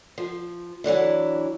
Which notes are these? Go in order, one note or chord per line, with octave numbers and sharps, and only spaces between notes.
F3
E3 F#3 D4 E4